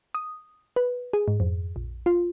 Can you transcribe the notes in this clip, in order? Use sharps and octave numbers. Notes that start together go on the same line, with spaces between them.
D#6
B4
G#4
G#2
F2
A#1
F4